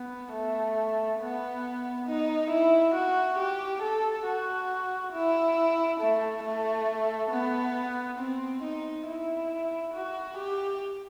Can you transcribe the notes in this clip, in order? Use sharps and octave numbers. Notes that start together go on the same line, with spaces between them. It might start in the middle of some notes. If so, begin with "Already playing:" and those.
Already playing: B3
A3
B3
D#4
E4
F#4
G4
A4
F#4
E4
A3
A3
B3
C4
D#4
E4
F#4
G4